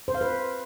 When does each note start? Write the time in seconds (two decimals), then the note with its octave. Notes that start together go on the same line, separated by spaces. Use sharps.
0.08 C5
0.15 F5
0.21 B4